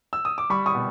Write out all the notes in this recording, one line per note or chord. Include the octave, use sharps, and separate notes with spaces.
E6
D#6
D6
G3 B5 C#6
C#6 D#6
B2